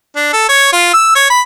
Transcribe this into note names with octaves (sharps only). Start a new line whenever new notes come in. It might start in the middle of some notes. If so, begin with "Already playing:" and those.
D4
A4
C#5
F4
E6
C#5
B5